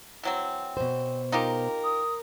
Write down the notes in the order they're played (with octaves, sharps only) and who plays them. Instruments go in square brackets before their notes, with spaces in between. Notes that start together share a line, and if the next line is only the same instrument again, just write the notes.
[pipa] E3 F#3 C4
[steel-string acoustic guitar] B2 C5
[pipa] D#4 F4 G4 [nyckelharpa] A#4
[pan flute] D#6